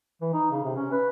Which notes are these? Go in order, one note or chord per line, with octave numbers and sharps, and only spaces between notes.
E3
D#4
C#3
C3
C#4
B4